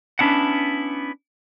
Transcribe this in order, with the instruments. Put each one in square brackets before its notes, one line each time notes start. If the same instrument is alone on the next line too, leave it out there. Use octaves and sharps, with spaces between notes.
[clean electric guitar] B3 C#4 D4 E4 F#5